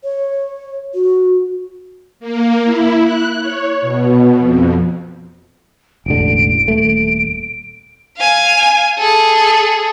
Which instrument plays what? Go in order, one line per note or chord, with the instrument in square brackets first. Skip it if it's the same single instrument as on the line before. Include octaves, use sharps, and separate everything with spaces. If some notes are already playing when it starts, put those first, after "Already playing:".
[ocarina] C#5
F#4
[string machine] A#3
E4
F#6
C#5
B2
F2
[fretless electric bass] E1 A1 D3 [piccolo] D7
[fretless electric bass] D#1 A3
[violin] F5 G#5
G#4 A4